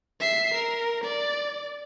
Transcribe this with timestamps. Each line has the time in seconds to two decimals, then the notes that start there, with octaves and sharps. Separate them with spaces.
0.20 E5 C7
0.54 A#4
1.04 D5